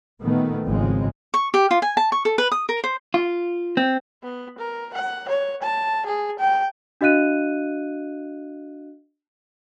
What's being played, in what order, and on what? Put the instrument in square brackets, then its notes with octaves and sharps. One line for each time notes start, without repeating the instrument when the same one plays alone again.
[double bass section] A#2 D#3 A3 B3
G#1 C#3 F3 G#3 C4
[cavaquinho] C#6
G4
F4
G#5
A5
C#6
A4
B4
D#6
A#4
C5
[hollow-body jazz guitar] F4
C4
[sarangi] B3
A#4
F#5
C#5
A5
G#4
G5
[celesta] D4 F#4 D#5 F5 F#6 D#7